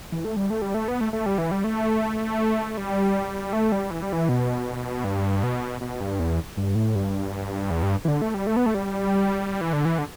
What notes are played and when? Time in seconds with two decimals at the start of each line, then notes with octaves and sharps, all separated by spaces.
0.12 E3
0.25 A3
0.36 G3
0.50 A3
0.62 G3
0.74 A3
0.88 B3
1.01 A3
1.13 A3
1.26 G3
1.38 E3
1.51 G3
1.64 A3
2.77 G3
3.53 A3
3.72 G3
3.91 E3
4.02 G3
4.13 E3
4.29 B2
5.04 G2
5.43 B2
5.81 B2
6.01 G2
6.19 E2
6.57 G2
6.75 A2
6.95 G2
7.71 E2
7.83 G2
8.05 E3
8.08 D3
8.22 A3
8.34 G3
8.47 A3
8.56 B3
8.66 A3
8.74 G3
9.61 E3
9.73 D3
9.85 E3
9.98 D3